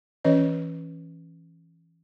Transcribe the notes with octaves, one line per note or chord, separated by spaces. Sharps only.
E3 C#4 B4 C#5 D#5